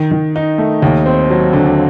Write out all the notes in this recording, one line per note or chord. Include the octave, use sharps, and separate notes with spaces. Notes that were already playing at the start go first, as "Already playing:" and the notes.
Already playing: D#3
D#3
D#4
A3
D#2
C4
F#3
D3